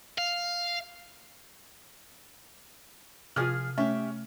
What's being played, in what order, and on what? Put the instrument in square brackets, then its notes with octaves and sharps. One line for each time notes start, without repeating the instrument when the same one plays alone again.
[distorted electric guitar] F5
[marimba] C3 G#6 [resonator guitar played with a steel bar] F3 G#4 [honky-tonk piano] F4 F6
[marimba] A3 [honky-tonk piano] C#4 [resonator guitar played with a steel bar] G4 E5